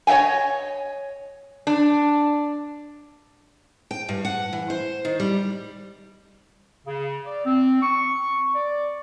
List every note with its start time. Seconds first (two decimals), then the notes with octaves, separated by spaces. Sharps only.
0.07 C#5 D#5 E5 G5 G#5
1.67 D4
3.91 G5
4.09 G2
4.25 F#5
4.53 E3
4.70 C5
5.05 D#3
5.20 G3
6.87 C#3
7.26 D5
7.46 C4
7.82 C#6
8.55 D5